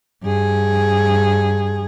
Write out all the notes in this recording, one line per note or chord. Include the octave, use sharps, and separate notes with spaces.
G2 G#4